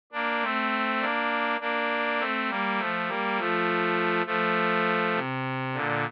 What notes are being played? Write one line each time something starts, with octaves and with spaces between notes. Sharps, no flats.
A#3 D4
A3 C4
A#3 D4
A#3 D4
A3 C4
G3 A#3
F3 A3
G3 A#3
F3 A3
F3 A3
C3
A#2 D3